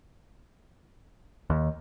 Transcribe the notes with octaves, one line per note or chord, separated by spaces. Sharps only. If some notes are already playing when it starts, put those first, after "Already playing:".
D#2